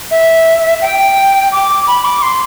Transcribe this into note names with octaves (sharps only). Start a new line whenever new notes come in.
E5
G5
D6
B5
D6
C6